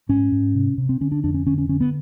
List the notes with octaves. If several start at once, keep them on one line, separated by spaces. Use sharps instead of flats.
G#2 C#4
G#2
C3
C3
C4
D3 C#4
D4
F2 D4
C#4
D3 C#4
C#4
D3 C#4
B3